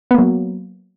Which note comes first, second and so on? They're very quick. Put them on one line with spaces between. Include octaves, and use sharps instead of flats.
B3 A#3 F#3